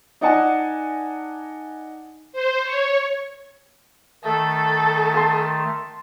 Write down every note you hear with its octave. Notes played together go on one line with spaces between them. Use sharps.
D#4 D5 D#5 F#5 G#5 A5
C5
C#5
D#3 A3 A4
A5 C6